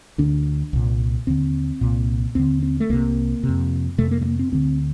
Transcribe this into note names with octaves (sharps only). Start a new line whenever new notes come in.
D2 D3 D4
C2 A#2
D#2 D3 C4
C2 A#2
D#2 D3 C4
C4
A3
C2 C3 A#3
C3
F2
F2 C3 A3
A#3
A3
A#3
C4
D2 D3 C4